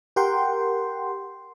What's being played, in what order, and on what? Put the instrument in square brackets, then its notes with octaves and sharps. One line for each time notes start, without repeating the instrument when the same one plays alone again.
[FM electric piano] G4 A#4 F#5 G5 C6